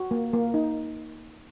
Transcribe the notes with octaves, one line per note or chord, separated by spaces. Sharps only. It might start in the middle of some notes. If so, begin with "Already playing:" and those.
Already playing: F#4
A#3
A#3
D#4